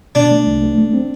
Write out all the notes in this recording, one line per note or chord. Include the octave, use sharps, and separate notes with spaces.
B2 D4
A3
C2
A3
A3
C4